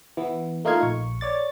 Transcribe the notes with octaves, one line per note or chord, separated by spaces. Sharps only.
E3 B3
A3 A#3 D#4 F4 F5 G#6
A#1 C#6
C#5 D5 A6